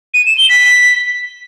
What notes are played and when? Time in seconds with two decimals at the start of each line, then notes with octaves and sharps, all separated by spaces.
0.14 D#7
0.26 E7
0.38 G7
0.49 B6